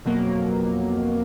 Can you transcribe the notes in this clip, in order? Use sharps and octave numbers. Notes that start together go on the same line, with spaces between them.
F2 B2 F#3 A#3